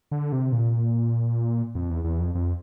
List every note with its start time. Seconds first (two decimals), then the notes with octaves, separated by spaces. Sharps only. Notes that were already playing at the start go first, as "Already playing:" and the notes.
0.11 D3
0.32 C3
0.52 A#2
1.75 F2
1.90 E2
2.04 E2
2.20 F2
2.35 F2